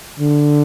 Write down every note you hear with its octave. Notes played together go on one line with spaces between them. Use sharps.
D3